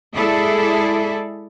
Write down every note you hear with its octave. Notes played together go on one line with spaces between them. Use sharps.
G#3 E4 G#4 A4 D5 E5